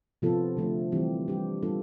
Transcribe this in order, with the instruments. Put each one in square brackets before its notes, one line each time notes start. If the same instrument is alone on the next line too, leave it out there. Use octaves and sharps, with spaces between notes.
[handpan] C3 F3 B3 F4 A4
D3 F3 A3
E3 G3 C4 G4
G3 D4 G4
G3 B3 D4 F4 A4